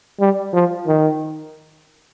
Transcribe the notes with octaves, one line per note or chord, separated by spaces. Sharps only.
G3
F3
D#3